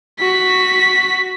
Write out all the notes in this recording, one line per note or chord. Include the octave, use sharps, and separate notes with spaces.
F#4 B6